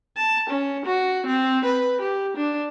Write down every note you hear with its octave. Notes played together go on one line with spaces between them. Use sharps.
A5
C#4
F#4
C4
B4
G4
D4